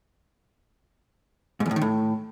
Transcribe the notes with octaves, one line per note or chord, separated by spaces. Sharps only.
G#2
E2
A2
D#3
A2